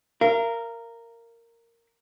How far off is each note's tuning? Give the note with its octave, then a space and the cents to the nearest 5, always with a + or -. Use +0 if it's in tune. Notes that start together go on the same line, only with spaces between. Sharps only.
A#4 -10 F5 -35